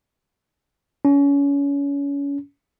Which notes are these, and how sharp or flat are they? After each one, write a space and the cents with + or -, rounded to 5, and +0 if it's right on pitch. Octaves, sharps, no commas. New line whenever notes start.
C#4 +30